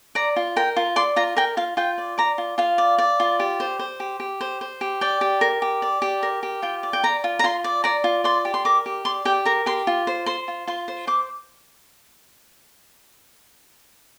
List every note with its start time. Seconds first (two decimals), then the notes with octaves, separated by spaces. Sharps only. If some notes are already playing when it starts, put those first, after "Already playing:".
0.15 D5 A#5
0.36 F4
0.56 A#4 G5
0.77 F4
0.96 D5 C6
1.16 F4 A#5
1.37 A#4 G5
1.57 F4 F5
1.77 F4 G5
1.98 D5
2.18 D5 A#5
2.38 F4
2.58 F4 F5
2.78 D5
2.98 D5
3.20 F4
3.40 G4
3.60 C5
3.79 C5
4.00 G4
4.20 G4
4.41 C5
4.61 C5
4.81 G4
5.01 D5 G5
5.21 G4
5.41 A#4
5.62 G4
5.82 D5
6.02 G4
6.23 A#4
6.43 G4
6.62 F4 G5
6.83 D5
6.93 G5
7.03 D5 A#5
7.24 F4
7.39 A#5
7.44 F4 C6
7.64 D5
7.84 D5 A#5
8.04 F4
8.24 D5 C6
8.45 G4
8.54 C6
8.65 A#4 D6
8.86 G4
9.05 D5 C6
9.25 G4 G5
9.46 A#4 A#5
9.66 G4 C6
9.87 F4
10.07 C5
10.26 C5 C6
10.48 F4
10.67 F4 C6
10.88 C5
11.07 C5 D6